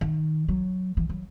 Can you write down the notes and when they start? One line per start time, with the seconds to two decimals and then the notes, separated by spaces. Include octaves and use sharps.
0.01 D#3
0.48 F#3
0.97 E3
1.09 F#3